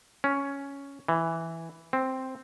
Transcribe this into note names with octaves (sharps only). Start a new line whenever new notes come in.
C#4
E3
C4